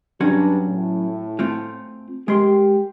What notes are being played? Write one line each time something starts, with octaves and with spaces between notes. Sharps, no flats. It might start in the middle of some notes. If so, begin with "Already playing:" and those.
G2 F#3 C#4 D4 F#4
A2
A3 C4 F4
G#3 G4 A#4 C6